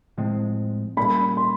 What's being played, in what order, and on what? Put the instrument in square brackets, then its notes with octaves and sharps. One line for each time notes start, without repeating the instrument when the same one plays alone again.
[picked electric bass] A2 F3 G#3 C4
[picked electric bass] A#2 G3 A#3 C#4 [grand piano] B5
[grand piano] C6